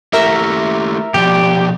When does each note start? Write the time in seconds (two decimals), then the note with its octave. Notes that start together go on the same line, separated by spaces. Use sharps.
0.13 A3 E4 G4 A#4 E5
1.14 B2 F3 G4 D5